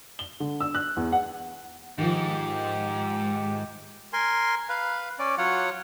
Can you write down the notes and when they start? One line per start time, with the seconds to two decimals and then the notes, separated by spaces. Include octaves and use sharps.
0.19 G7
0.40 D3
0.60 E6
0.75 F#6
0.97 E2
1.12 F#5
1.98 G#2 D#3 F3 G4
4.13 A#4 G#5 C6
4.69 B4 F5
5.19 C#4 D5
5.38 F#3 F4 C#5 F#5